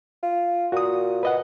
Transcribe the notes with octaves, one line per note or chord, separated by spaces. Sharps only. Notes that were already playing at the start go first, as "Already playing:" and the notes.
F4
A#2 F#4 D#6
B4 D#5 F#5